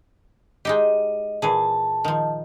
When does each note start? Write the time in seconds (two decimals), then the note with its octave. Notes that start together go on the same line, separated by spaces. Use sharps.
0.65 G#3 D#4 G4 D#5
1.42 A#2 E3 G#4 A5
2.05 D#3 F3